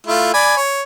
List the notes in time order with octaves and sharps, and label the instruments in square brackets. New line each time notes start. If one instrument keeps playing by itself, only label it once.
[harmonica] A3 E4 F4
D5 G#5 B5
C#5